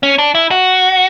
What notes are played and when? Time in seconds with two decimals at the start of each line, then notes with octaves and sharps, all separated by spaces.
0.03 C#4
0.18 D4
0.35 E4
0.51 F#4